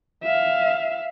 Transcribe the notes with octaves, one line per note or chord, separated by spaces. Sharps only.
E5 F5